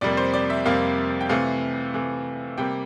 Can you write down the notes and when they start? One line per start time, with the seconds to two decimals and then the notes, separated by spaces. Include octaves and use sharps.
0.01 F2 C3 G3 A#3 D5
0.17 C5
0.34 D5
0.50 E5
0.66 F2 C3 G3 A#3 F5
1.21 G5
1.29 C3 E3 A3 F5
1.94 C3 E3 A3
2.58 C3 G3 A#3 G5